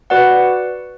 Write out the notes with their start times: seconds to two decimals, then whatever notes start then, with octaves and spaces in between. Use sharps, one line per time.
0.10 F#4 B4 D5 F#5